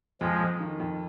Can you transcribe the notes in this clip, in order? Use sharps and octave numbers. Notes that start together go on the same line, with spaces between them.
F2 F3 G#3
F2
D#3
F2